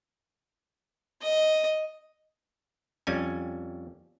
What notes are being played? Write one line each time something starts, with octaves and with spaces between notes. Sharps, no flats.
D#5
F2 G3 C#4 G#5